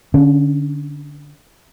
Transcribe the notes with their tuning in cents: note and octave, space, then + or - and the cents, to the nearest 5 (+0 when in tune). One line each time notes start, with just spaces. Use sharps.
D3 +0 C#4 +15